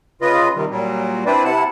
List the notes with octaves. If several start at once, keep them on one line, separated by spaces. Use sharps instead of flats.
C#3 F4 B4 D#5
C3 D#3 G3
A#2 F#3 G3
C4 D4 E4 B4 C5 D5
C3 E4 F#5 A5